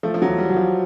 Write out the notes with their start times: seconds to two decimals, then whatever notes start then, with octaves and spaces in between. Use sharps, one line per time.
0.03 F3 A3
0.14 F3
0.22 F#3
0.27 E2
0.38 G3
0.50 F#3
0.56 F3